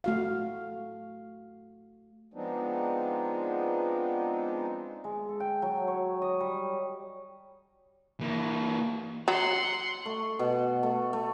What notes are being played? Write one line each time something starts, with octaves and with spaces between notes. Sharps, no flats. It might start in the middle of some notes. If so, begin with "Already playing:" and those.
A3 F#4 F5
F3 G#3 B3 C4 D4 D#4
G#3
A4
G5
F#3
C#5
D#5
G3
E3 A#3
F#3 F#5 C6
A3
B2
A3
A3